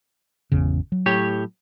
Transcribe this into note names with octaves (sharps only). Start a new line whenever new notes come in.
G#1 E2 C#3
F#3
A2 G4 C#5